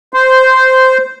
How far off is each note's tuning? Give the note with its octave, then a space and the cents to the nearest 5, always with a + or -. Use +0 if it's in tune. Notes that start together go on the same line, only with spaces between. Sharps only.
C5 -10